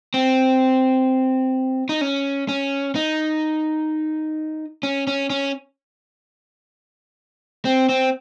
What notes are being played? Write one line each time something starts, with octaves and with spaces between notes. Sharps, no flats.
C4
D#4
C#4
C#4
D#4
C#4
C#4
C#4
C4
C4